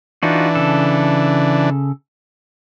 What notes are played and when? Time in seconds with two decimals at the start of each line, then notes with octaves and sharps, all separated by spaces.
0.23 E3 D4 D#4 F4 F#4
0.55 C#3 A4